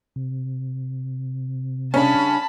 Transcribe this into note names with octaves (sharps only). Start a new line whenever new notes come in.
C3
C#3 G3 C#4 D4 A5 B5